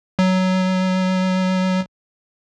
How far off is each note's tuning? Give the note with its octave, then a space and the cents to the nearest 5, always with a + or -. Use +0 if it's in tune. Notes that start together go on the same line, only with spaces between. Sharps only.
F#3 +10